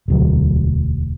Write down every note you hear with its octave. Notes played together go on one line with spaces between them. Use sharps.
E1 D2 F#3